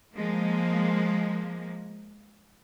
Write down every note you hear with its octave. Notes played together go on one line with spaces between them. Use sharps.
F3 G#3 A#3